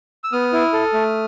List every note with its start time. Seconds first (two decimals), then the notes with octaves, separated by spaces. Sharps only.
0.24 E6
0.32 B3 D#6 F6
0.53 E4
0.73 A4
0.94 A3